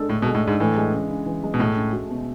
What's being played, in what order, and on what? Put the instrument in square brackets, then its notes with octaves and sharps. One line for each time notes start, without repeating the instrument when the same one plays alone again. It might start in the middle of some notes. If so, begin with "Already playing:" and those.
Already playing: [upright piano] G#3 D4 A4
[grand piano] A2 [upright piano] D3
[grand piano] B2
[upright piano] G#3
[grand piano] A2
[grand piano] G#2 [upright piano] D4
[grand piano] A2 [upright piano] E3
[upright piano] G#3
C#3
C#3
E3
G#3
[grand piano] B2
[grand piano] A2 [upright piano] A3
[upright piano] C#4
F#4
B2